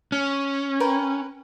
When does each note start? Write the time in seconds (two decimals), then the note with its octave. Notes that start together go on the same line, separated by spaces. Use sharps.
0.12 C#4
0.80 A#4 B4 G5